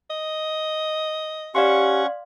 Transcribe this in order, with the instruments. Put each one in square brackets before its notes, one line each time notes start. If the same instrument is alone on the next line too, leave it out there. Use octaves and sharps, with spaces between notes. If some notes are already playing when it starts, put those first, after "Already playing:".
[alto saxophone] D#5
[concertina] C#4 F#5 C#6 [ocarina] G4 [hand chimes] D5 F5 C6